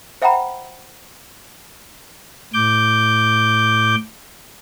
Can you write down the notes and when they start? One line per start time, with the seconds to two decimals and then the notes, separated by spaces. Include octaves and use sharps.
0.22 C5 E5 F#5 G5 A#5 B5
2.54 A2 D6 G6